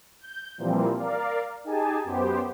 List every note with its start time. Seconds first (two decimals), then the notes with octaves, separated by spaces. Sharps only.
0.21 G6
0.58 A#2 E3 F3 G3 A#3 C4
0.96 A#4 D5 F5
1.64 D#4 G4 G#4 G#5 A5
2.04 F#2 B3 G4 C5